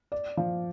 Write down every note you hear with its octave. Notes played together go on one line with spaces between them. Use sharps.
D5
F3